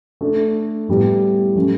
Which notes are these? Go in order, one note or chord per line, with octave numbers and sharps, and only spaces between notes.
A3 D4 A4
A2 G3 B3 E4 G4
F#3 A3 C#4